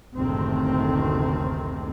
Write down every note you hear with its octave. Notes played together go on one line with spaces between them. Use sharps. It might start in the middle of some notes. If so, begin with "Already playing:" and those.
F#1 D2 A2 C3 D#3 C4